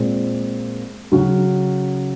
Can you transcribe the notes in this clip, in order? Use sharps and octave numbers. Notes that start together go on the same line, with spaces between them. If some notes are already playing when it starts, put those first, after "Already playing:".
Already playing: A#2 G#3 C4
C#3 F#3 C#4 F#4